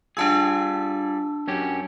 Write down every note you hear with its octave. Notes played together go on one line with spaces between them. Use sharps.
G3 D4 F4 G#4 A5 E6
F#2 C#4 G4